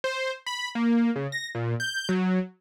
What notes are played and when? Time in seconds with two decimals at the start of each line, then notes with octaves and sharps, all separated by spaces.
0.04 C5
0.46 B5
0.75 A#3
1.16 C#3
1.32 A#6
1.55 A#2
1.80 G6
2.09 F#3